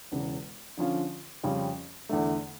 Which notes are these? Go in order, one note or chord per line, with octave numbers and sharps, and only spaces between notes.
E1 E2 C#3
D3 F3 C#4 F4
F2 C#3 G3 C#4 F4
E2 D3 A3